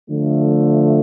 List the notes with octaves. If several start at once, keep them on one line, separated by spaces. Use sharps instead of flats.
D3 F3 A3